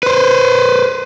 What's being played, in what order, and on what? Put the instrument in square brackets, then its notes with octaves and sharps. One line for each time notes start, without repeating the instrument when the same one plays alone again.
[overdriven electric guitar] B4 C5